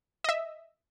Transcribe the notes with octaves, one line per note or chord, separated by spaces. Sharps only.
D#5 E5